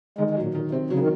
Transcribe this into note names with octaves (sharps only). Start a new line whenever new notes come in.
D#3 G#3
G#3
F#3
A#2
A#2 D#3
C3 C4
C#3 F#3
D#3